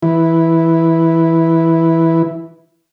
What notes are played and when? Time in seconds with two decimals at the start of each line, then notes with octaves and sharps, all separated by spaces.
0.02 E3 E4